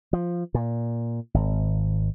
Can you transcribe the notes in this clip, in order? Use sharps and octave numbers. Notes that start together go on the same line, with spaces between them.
F3
A#2
G#1